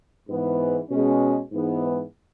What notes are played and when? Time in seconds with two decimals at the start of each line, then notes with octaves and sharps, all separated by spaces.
0.28 G#2 E3 B3
0.90 B2 G#3 C#4
1.52 G#2 E3 B3